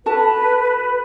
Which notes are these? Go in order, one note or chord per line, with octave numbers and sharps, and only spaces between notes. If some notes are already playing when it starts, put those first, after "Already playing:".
F#4 A4 B4 A5